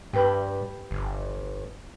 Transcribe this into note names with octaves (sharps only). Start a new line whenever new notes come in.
G2 G4 B4 B5
G1